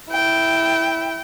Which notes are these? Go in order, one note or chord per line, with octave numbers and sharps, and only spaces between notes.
E4 G5